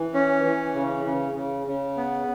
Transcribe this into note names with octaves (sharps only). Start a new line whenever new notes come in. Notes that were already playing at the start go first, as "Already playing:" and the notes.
Already playing: E3
C#4
E3
C#3
C#3
C#3
C#3
B3